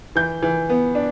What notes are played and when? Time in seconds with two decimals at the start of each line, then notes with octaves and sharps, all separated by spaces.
0.16 E3 G6
0.43 E3
0.70 B3
0.95 D4